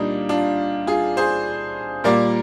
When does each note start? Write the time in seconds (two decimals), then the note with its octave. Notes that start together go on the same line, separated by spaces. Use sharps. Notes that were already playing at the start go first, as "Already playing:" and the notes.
Already playing: A#2 G3 A#3 D4 D#4
0.29 D4 F4
0.87 F4 G#4
1.17 G#4 C5
2.04 A#2 G3 A#3 A#4 D5